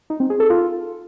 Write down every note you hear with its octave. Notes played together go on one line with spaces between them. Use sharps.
D#4
C4
G#4
A4
F4